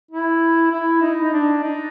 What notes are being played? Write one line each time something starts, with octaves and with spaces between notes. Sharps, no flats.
E4
E4
D#4
D#4
D4
D#4